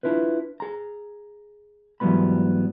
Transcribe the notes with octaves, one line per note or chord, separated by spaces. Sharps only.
D4 E4 F4 B4
G#4 A#5
G#2 E3 F#3 G3 B3 B5